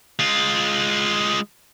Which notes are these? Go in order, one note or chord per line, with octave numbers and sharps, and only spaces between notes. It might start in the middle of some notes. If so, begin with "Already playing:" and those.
G#3 F4